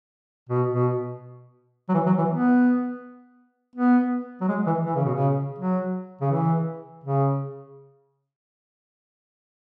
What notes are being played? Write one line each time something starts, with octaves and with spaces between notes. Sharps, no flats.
B2
B2
F#3
E3
F#3
E3
B3
B3
F#3
G#3
E3
E3
C#3
B2
C#3
F#3
C#3
E3
C#3